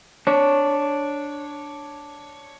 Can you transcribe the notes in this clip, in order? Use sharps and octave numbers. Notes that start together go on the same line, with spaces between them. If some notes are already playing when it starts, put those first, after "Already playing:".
D4 C#5